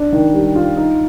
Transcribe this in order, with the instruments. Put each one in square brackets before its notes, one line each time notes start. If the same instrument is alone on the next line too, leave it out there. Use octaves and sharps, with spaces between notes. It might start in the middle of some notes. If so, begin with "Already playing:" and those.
Already playing: [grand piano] D4
D#3
G3
F4
D#4